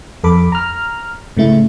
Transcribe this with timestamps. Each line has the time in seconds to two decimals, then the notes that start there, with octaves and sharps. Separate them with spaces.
0.24 F2 A4 B5 D6
0.52 A#5 F6
1.37 A2 C#3 A3 E4